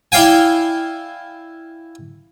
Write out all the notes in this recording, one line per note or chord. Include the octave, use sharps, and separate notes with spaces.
E4 D5 F5 G5 G#5